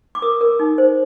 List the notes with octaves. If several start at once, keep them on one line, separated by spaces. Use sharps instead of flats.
D6
A#4 D#6
A#4
D#4
C5